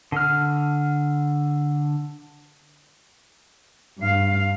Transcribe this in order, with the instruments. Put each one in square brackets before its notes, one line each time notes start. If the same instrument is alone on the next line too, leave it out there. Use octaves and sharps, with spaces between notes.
[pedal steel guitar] D3 F6
[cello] G2 F5